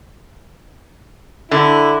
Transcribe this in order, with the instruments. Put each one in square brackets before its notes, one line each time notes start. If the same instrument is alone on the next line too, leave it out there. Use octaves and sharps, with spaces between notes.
[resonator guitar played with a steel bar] D3 [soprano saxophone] E4